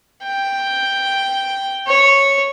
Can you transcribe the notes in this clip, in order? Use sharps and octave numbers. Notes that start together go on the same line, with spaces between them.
G5
C#5